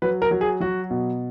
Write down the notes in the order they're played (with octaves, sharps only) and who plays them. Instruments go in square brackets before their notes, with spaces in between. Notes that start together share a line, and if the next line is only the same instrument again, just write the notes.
[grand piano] F#3 B4
A#4
F#3
G#4
F#3 F#4
B2